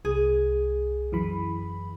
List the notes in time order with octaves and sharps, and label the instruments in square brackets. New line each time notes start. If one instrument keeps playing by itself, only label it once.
[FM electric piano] C2 [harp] G#4
[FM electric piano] F#2 E3 B5